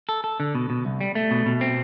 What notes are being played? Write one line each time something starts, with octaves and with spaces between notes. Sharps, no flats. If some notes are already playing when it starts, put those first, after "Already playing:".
A4
A4
D3
B2
B2
C2
G3
A3
B2
B2
C4